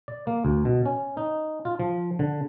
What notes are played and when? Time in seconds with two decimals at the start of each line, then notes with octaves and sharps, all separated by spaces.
0.08 D5
0.27 A#3
0.45 D2
0.65 B2
0.86 C#4
1.17 D#4
1.65 F4
1.80 F3
2.19 D3